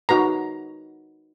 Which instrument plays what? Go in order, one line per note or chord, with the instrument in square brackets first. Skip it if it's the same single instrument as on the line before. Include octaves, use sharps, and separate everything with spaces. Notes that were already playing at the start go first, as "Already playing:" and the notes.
[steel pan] D#4 F#4 B4 A#5